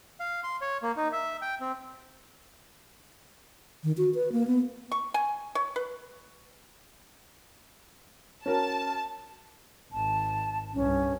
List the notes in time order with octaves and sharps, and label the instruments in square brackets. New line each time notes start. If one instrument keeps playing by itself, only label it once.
[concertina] F5
C6
C#5
A#3
D#4
E5
G5
C4
[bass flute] D#3
F#4
B4
A#3
B3
[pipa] C#6
G#5
C#5
B4
[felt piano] C#4 F#4 A#4 [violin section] A5
[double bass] G#1 [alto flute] A5
[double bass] C2 G2 [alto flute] C#4